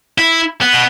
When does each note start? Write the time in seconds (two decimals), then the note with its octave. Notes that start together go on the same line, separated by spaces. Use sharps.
0.18 E4
0.62 B3
0.73 B2